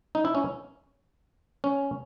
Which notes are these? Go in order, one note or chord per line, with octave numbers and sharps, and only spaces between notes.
D#4
E4
C#4
C#4